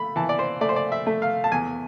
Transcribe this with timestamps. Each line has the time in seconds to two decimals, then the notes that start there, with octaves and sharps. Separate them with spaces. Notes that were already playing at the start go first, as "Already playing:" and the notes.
Already playing: A3 B5
0.16 E3 A5
0.29 D5
0.39 C5
0.61 A3 D5
0.69 C5
0.76 D5
0.92 E5
1.06 A3
1.22 F5
1.44 A5
1.52 E2 G#5